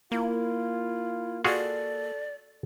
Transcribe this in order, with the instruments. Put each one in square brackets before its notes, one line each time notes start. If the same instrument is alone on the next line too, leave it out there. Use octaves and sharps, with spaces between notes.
[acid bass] A#3 [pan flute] E4 [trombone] F4
[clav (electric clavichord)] F4 F#4 G#4 [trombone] A4 [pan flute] D5